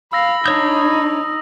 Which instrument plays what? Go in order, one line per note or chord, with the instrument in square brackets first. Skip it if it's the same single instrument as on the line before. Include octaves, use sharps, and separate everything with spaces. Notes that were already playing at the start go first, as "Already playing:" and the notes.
[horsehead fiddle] F5 [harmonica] B5 [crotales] E6 A#6
[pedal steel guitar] D4 C#5 G6 [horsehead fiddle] D#4 [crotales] D#6